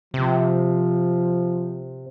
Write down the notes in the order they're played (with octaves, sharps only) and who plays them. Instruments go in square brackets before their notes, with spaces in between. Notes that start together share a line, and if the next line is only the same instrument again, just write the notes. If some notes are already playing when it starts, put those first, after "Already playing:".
[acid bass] C3 [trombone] F3